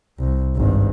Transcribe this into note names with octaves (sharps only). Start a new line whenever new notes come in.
C2
G#1 G2